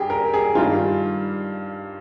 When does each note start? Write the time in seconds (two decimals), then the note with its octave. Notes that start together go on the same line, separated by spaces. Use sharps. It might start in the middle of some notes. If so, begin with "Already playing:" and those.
Already playing: G2 G4 G#4
0.10 A#4
0.33 G#4
0.55 G2 D#3 G3 F4